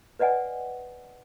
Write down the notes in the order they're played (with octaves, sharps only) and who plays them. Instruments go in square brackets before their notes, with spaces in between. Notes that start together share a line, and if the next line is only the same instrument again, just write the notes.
[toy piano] B4 D5 D#5 F#5 G#5